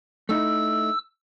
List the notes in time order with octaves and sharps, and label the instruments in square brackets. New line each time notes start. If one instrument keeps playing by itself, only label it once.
[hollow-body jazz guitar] A3 D#4 E4 [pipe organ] E6